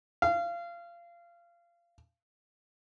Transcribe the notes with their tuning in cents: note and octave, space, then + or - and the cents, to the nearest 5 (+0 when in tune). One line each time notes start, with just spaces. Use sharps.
F5 -25